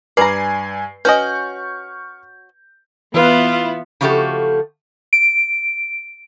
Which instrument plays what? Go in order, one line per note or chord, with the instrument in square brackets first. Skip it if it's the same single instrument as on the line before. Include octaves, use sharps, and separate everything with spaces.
[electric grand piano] G2 G#5 C7 [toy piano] B4 B5 [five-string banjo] D5 A#5
[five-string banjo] C#4 F#4 D#5 [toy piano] B4 G#5 [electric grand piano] C#6 F6 G6
[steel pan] E3 B4 [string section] B3 E4 [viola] F4
[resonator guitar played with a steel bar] C#3 F3 A3 F#4 G4 A4
[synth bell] D7